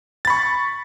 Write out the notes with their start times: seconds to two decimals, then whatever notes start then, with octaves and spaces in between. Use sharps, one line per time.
0.25 A6
0.27 B5
0.30 C#6